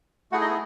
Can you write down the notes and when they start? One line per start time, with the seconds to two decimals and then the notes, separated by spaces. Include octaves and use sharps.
0.32 A3 E4 F#4 G#4 F#5
0.41 D#4 D#5
0.50 B3